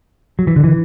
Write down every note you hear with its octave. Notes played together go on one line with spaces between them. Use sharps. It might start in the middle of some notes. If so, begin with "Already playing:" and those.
F#3
E3
D3
E3